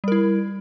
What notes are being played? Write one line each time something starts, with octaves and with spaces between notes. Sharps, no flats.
G3 E4 A#4